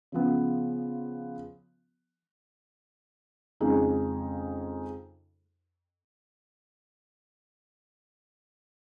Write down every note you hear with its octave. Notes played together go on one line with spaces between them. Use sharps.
C#3 F3 B3
F2 C#3 G#3 D#4 G#4